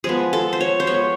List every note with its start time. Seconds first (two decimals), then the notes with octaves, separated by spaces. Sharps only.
0.04 F3 G#3 B3 G#4
0.33 A4
0.53 C5
0.61 C#5
0.80 C5
0.87 F3 G#3 B3 C#5